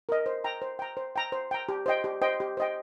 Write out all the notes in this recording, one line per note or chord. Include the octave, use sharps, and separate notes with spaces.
A#4 D#5
C5
G5 A#5
C5
G5 A#5
C5
G5 A#5
C5
G5 A#5
G4
C5 D#5 G5
G4
C5 D#5 G5
G4
C5 D#5 G5